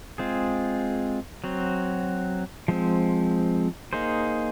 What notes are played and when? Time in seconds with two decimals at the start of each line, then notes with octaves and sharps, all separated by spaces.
0.18 G#3 C4 F4 G#4
1.44 F#3 C4 F#4
2.68 F3 G#3 C4
3.93 A#3 D#4 G#4 C5